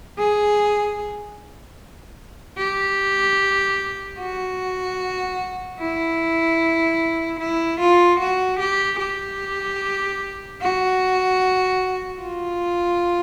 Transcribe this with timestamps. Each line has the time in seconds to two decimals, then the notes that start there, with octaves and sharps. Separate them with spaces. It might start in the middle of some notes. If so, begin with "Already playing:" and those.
0.19 G#4
2.58 G4
4.20 F#4
5.79 E4
7.40 E4
7.80 F4
8.19 F#4
8.60 G4
9.00 G4
10.61 F#4
12.21 F4